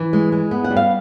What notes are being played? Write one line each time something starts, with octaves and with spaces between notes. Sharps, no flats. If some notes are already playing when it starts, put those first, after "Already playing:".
Already playing: E3
G#3
G#3
B3
F#5
G3
F5